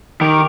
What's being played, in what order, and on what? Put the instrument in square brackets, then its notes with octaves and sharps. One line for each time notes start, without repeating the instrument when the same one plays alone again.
[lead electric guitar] D#3 [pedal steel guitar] G4 A#4